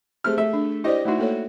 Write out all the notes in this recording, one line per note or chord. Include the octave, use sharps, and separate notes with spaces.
A3 C4 G4 G#4 F6
A3 E5
D4
E4 G4 C5 D5 D#5
A3 D#4 E4 F#4
A#3 A4 C#5